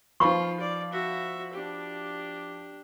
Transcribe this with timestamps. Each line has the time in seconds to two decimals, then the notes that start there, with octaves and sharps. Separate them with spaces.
0.20 F3 D#4 F4 B4 F5 B5 C#6
0.60 D5
0.92 F#4 E5
1.53 D4 G4